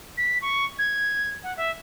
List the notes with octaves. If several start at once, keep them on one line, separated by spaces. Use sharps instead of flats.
B6
C#6
G#6
F#5
E5